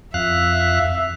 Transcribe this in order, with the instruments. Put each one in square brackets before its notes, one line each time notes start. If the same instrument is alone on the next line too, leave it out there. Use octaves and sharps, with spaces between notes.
[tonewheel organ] F2 F5 F#6 [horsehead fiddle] E5